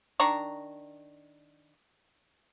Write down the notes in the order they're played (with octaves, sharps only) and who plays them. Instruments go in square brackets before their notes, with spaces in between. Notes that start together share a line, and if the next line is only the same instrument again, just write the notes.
[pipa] D#3 D4 A#5 C#6